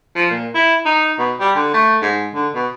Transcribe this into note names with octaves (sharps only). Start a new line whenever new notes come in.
F3
A#2
E4
D#4
B2
G3
D3
A3
G#2
D3
B2